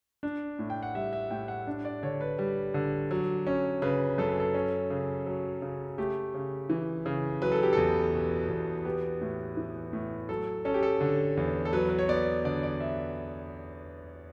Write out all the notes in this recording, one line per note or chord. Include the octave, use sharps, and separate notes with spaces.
D4
A2
G5
F#5
G3 E5
E5
A2 G5
F#5
D4
D5
D3 C#5
B4
G3
D3
F#3
C#4
C#3 B4
F#2 A4
B4
A4
C#4
C#3
F#3
C#3
A3 G4
C#3
E3
C#3
F#3 B4
A4
G4
E2 A4
B2
E2
B3 G4
A2
E3
A2
F#3 A4
C#4 A4
G4
A4
D3
E2
A4
F#3 B4
B4
C#5
B3 D5
D3 D5
D5
E5